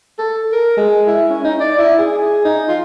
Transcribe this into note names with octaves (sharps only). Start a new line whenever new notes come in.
A4
A#4
G#3
E4
C#4
D#4
D5
E4
G#4
D#4
F4